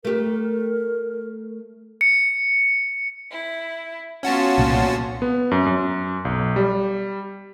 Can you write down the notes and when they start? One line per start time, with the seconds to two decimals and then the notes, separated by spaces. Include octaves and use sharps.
0.05 A3 G4 A#4
2.01 C#7
3.31 E4
4.23 B3 C#4 F4 F#4 A5
4.58 C2 A#2 A#3
5.22 B3
5.51 F#2
5.66 F#2
6.25 B1
6.56 G3